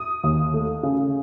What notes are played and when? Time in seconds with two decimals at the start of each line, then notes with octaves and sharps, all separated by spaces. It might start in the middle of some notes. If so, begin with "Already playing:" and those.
Already playing: D#6
0.24 D#2
0.54 A3
0.83 C#3